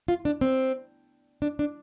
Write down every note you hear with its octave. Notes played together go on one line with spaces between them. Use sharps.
F4
D4
C4
D4
D4